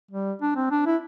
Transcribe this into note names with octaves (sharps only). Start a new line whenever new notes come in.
G3
D4
C4
D4
E4